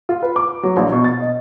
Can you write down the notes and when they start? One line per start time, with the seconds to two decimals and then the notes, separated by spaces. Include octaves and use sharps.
0.09 F4
0.23 B4
0.36 D6
0.63 F#3
0.77 A#1
0.92 B2
1.04 A6
1.21 D#5